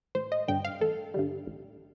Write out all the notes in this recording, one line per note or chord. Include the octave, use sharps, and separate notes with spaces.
A1 C5
D#5
G2 D3 G3 G5
F5
A1 A4
G2 D3 G3
A1